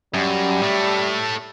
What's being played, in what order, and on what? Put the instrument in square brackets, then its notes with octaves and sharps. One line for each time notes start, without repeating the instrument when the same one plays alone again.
[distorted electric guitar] F#2 [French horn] G3
[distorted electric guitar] A2 A3